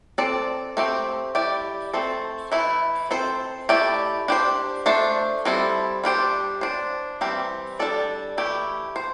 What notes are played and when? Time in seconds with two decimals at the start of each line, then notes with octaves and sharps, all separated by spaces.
0.18 C4 A4 D5
0.77 A3 C4 G4
1.35 G3 E4 G4 D5
1.93 A3 C4 A4 C5
2.52 E3 A3 E4
3.11 C4 A4 C5
3.69 A3 E4 G4 D5
4.28 D4 G4 C5
4.86 A3 D4 C5
5.45 G3 C4 E4 A4
6.04 G3 D4 G4 C5
6.61 D4 C5
7.21 E3 G3 C4 G4
7.79 G3 D4 A4 D5
8.38 E3 A3 E4 G4
8.96 C5